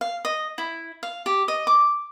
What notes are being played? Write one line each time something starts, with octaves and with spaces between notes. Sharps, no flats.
F5
D#5
E4
F5
G4
D#5
D6